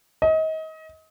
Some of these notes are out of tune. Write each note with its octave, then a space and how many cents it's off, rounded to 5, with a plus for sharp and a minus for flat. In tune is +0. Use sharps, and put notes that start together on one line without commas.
D#5 +30